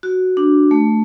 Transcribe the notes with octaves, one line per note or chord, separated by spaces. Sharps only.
F#4
D4
A3